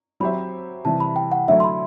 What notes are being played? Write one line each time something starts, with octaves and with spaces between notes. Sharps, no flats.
F#3 C4 G4 C5 E5 B5
C3 E3 G3 A5
B5
G5
F#5
D3 F#3 A3 E4 A4 E5
C6
B5